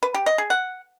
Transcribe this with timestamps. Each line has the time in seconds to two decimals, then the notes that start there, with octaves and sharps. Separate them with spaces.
0.03 B4
0.14 G4
0.26 D#5
0.38 G#4
0.50 F#5